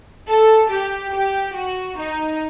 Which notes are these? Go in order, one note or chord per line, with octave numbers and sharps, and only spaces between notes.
A4
G4
G4
F#4
D#4